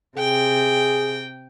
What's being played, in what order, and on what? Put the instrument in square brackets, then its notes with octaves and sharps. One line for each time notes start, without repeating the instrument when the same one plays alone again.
[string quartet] C3 G5 [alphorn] G#4